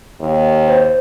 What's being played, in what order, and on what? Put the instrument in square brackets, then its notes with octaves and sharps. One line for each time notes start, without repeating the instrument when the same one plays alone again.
[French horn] D#2
[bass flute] C5